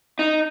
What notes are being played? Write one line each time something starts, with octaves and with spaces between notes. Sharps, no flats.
D#4